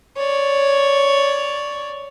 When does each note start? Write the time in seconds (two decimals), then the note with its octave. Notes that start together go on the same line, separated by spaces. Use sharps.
0.17 C#5 D5